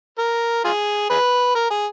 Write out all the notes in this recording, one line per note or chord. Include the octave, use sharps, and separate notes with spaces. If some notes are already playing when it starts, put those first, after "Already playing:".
A#4
F4 G#4
G#4 B4
A#4
G#4